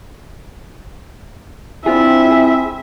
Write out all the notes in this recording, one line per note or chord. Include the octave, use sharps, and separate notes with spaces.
C4 D4 E4 F4 G#4 E5
G#4